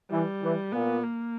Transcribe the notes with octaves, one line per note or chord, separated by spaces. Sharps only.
E3 G3
E3
A#2 B3
A#3